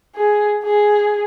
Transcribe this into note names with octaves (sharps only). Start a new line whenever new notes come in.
G#4
G#4